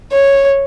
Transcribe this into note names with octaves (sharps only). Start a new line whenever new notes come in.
C#5